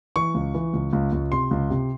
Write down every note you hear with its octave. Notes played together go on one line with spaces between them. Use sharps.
E3 C#6
C#2
E3
C#2
C#2
C#2
C3 C6
C#2
C3